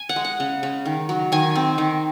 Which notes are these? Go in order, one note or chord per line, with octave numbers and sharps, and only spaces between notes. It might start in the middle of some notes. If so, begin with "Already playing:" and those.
Already playing: G#5
F#5
G#3
F#5
C#3
C#3
D#3
F#3
D#3 G#5
C4
D#3